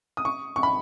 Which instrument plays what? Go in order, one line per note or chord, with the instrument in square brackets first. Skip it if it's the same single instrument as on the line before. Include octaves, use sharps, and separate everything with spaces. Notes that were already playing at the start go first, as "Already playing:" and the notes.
[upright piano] D#6
C#6
C#6
B5